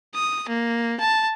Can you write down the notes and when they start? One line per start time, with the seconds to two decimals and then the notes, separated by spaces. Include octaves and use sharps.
0.15 D#6
0.49 A#3
1.00 A5